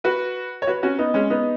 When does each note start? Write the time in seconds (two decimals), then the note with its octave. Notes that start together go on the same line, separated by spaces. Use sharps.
0.04 F#4 B4
0.62 C#5
0.67 F#4 B4
0.83 C#4 F#4
0.98 B3 D#4
1.14 G#3 C#4
1.30 B3 D#4